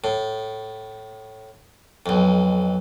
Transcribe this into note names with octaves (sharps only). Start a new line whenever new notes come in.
A2
B1 F2